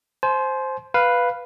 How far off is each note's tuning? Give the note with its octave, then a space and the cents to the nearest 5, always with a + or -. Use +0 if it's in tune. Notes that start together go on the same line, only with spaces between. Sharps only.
C5 +0 G#5 +45
B4 +0 F5 +0